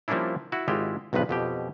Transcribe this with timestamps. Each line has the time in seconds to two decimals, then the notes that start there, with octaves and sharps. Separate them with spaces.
0.08 F3 G3 A#3 C#4 D4 E4
0.52 E4 F#4
0.68 G#1 G#3 E4 F4 G4
1.13 B1 E2 G2 F3 B4
1.29 F2 B2 G4